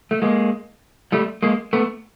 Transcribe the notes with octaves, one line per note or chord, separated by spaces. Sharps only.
A3
G#3 A#3
G3 A3
G#3 A#3
A3 B3